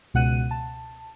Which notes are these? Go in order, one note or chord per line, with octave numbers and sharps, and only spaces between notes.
C#2 B2 F#5 F#6 D#7
A5